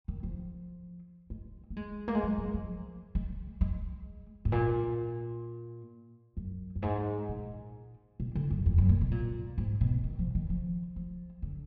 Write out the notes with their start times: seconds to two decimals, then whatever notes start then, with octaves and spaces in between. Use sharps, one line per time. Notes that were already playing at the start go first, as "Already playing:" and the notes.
0.08 D#3
0.23 F3
1.30 G#3
1.70 A#3
1.77 G#3
2.08 A#3
2.15 G#3
2.23 F#3
2.38 F#3
2.54 F3
3.15 G#3
3.61 G#3
4.45 G#2
4.52 A#2
6.37 F#2
6.76 F#2
6.82 G#2
7.29 A#2
8.20 B2
8.35 D3
8.50 F#2
8.66 F2
8.78 F#2
8.89 A#2
9.01 B2
9.11 A#2
9.58 G#2
9.81 B2
10.04 D#3
10.19 F3
10.35 D#3
10.50 F3
10.96 F3
11.42 D3